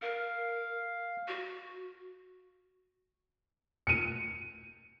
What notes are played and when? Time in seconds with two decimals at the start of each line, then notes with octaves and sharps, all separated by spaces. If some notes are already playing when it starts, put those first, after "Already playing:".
0.02 A#4 F5
1.28 F#4
3.87 C#7 D#7